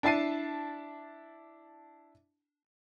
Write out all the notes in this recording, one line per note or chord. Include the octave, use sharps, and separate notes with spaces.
D4 E4 A5 C7 D#7